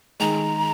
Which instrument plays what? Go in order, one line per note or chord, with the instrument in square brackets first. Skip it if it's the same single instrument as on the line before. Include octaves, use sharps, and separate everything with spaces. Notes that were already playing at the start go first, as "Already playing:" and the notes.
[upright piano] D#3 G#3 [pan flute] A#5